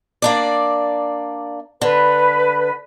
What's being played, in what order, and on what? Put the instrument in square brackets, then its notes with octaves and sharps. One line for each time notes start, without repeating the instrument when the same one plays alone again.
[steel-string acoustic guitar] A#3 D4 D5
[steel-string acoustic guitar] D3 [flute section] B4